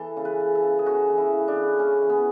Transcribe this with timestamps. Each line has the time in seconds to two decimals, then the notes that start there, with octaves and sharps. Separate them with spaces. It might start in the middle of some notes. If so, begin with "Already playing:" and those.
Already playing: E3 A4
0.17 C#3
0.25 B4
0.40 C#3
0.55 A4
0.63 C#3
0.79 G#4
0.86 C#3 F#4
1.10 E3
1.18 E4
1.33 C#3
1.48 D4
1.56 C#3
1.79 C#3 C#4
2.02 E3
2.10 B3